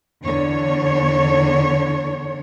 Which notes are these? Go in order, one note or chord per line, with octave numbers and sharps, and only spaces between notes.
E2 D3 D4 C#5